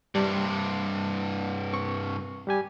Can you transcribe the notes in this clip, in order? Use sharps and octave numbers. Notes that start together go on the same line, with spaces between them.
G2 C3 G3
C4 C#6
G3 G4 G#5